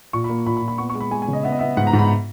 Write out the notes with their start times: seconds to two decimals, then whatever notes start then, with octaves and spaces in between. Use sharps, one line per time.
0.13 A#2 C#6
0.24 B5
0.30 A#3
0.46 A#2 B5
0.57 B5
0.62 A#2
0.68 B5
0.78 B3 C#6
0.90 C#6
0.95 G#3
1.00 B5
1.11 G#3 G#5
1.22 G#5
1.28 C#3
1.33 D#5
1.43 B3 E5
1.52 D#5
1.59 B3 E5
1.77 G#2 F#5
1.87 A#5
1.93 G#2
1.99 B5